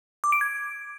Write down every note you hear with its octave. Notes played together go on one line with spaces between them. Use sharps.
D6
D7
G#6